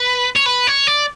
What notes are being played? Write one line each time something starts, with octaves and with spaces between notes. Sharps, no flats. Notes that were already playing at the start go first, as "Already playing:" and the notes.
Already playing: B4
C#5
B4
C#5
D5